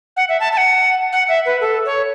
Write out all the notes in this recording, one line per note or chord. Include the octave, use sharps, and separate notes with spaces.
F#5
E5
A5
A5
F#5
F#5
E5
B4
A4
C#5